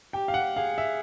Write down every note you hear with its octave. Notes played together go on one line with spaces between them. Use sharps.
G4 G5
F5
F#5
G#4 F5
E5